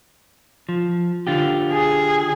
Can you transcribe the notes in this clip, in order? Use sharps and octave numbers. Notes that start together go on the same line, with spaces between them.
F3
D3 F4 G4
G#4